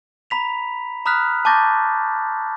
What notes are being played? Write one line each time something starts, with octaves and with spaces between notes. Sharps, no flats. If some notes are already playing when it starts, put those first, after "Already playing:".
A#5 B5 B6 F7
A#5 B5 D#6 F6 F#6 B6
A5 C#6 D6 G6 A6 A#6